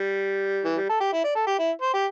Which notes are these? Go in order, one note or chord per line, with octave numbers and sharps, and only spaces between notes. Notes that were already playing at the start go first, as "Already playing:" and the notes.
Already playing: G3
E3
G3
A4
G4
E4
D5
A4
G4
E4
C5
G4